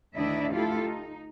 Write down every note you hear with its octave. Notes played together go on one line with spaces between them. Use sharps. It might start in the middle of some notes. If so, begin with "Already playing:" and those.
D2 D#3 D4 E4 D#5 E5
A3 E4 F4 G4 A4
D#4